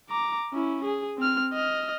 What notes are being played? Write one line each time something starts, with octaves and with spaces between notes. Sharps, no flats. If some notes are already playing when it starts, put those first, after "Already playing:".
A#5 D6
C#4 E4
G#4
C4 F6
D#5 F6